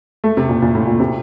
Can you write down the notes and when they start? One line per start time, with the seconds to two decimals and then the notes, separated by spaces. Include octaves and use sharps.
0.24 A3
0.37 C3
0.49 A#2
0.62 A#2
0.75 A2
0.87 A#2
1.00 C3